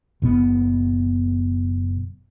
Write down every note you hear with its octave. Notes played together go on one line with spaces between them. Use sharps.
F#1 B2 B3